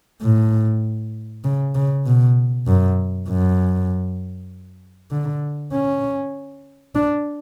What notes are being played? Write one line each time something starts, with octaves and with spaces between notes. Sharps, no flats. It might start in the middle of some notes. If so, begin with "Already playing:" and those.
A2
C#3
C#3
B2
F#2
F#2
D3
C#4
D4